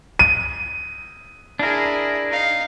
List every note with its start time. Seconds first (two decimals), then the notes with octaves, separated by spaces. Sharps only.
0.19 D#7
1.59 D4 E4 G#4 A#4
2.29 D#4 F5